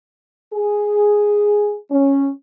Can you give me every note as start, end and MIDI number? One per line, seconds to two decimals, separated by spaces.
0.53 1.76 68
1.91 2.29 61